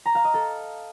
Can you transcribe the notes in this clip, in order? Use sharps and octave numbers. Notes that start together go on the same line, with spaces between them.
A#5
F5
D#5
A4